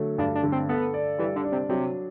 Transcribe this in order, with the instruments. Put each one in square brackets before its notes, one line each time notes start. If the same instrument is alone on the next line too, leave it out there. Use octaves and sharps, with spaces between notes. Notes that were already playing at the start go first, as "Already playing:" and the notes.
Already playing: [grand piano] D3 F#3 A3
[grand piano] G2 [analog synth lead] D4
[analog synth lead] D4
[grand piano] D3
[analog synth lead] C4
[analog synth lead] B3 [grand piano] A4
[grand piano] D5
[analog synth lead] E3 [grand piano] G3
[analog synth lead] D3
[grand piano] D4
[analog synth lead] C3
[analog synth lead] C3 [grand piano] F#3